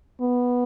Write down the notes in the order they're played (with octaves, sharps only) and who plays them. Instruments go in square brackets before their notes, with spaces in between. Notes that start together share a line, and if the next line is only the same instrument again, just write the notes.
[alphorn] B3